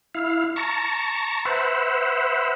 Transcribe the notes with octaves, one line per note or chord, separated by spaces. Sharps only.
E4 F5
A5 A#5 C#6
B4 C5 E5 F#5